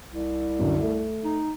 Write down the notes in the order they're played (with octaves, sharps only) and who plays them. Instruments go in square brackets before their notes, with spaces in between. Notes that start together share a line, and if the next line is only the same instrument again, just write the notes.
[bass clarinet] C2
[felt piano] F#2 D3
A3
[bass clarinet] D#4